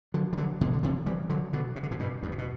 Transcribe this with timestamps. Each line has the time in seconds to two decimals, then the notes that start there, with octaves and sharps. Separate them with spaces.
0.14 D3 F#3
0.33 E3
0.37 D3 F#3
0.61 B2 D3
0.73 D3
0.83 C3 E3
1.06 E3 G3
1.29 D3 F#3
1.53 B2 D3
1.76 C3
1.83 D3
1.91 A2 C3
1.99 G2 B2
2.23 E2 G2
2.32 C3
2.38 B2